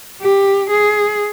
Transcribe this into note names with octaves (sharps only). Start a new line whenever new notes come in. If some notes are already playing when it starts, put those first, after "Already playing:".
G4
G#4